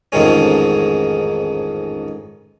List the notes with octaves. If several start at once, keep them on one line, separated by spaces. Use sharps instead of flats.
A1 F2 G#2 D#3 G#3 C#4